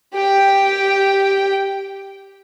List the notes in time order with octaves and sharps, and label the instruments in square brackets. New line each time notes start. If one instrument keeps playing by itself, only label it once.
[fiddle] G4 G5